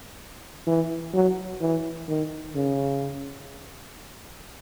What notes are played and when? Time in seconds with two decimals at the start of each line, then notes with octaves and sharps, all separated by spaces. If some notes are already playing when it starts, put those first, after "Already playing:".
0.66 E3
1.13 F#3
1.61 E3
2.08 D#3
2.55 C#3